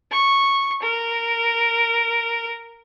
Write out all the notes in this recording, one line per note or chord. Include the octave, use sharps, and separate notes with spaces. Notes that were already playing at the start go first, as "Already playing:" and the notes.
C#6
A#4